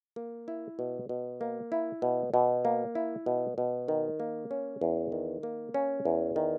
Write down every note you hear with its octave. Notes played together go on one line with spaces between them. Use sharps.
A#3
E4
B2
B2
A#3
E4
B2
B2
A#3
E4
B2
B2
D#3
A#3
C#4
E2
D#3
A#3
C#4
E2
D#3